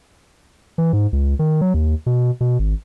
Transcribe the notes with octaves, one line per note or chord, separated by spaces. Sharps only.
E3
G#2
C#2
D#3
F#3
D#2
B2
B2
G#1